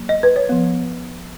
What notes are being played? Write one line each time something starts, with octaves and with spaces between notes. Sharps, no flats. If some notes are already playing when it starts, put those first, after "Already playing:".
Already playing: F#3 A#3
D#5
B4
C#5
F3 B3